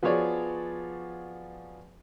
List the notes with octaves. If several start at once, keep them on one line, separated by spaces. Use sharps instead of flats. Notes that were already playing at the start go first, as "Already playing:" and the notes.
F3 B3 F#4 G#4 C#5 D5